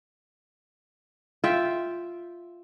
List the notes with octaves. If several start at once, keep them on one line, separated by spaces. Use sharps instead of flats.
F4 E5 G5